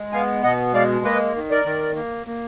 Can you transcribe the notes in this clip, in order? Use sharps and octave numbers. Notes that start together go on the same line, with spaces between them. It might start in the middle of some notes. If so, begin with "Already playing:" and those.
Already playing: G#3
B3 F5 G#5
B2 D#5 F#5
G#3 D5 F5
A#3 B4 D#5
D#3
A#4 D5
D#3
A#3
A#3